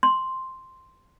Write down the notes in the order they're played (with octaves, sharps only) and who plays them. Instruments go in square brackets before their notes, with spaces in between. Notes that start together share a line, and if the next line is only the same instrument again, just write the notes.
[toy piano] C6